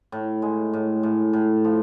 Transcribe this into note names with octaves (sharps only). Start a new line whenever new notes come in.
A2
G#3
A2
A2
A2
F3